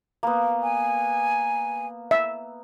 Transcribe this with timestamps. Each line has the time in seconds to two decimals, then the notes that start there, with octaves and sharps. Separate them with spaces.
0.23 A#3 B3
0.63 G#5
2.11 E5